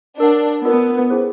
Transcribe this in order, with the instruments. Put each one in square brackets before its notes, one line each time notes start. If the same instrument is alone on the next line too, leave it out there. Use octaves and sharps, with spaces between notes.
[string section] D4 [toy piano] A#4 C#5 F#5
[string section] B3 [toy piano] F4 A#4 D5
[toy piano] C#4 E4 G#4 C5